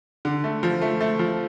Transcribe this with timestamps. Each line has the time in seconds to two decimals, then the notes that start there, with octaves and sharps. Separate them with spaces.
0.25 D3
0.44 A3
0.63 F3
0.81 A3
1.01 A3
1.19 F3